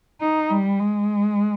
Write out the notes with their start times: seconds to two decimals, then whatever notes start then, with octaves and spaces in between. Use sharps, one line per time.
0.21 D#4
0.50 G3
0.79 G#3